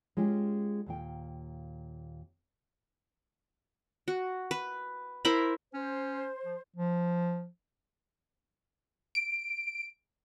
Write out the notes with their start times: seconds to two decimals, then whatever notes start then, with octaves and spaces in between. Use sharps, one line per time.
0.17 G#3 C#4 F4 G4
0.86 D#2 A#2 G5
4.08 F#4
4.51 B4
5.25 E4 A#4 C5 B5
5.74 C#4 C5
6.45 F3
6.76 F3
9.15 D7